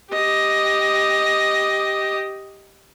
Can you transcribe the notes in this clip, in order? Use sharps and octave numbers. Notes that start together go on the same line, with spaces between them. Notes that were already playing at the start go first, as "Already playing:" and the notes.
G4 D#5